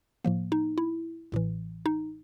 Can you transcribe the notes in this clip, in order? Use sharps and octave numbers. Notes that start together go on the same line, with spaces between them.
A2 F3 A#3
D#4
E4
A1 A2 E3
D#4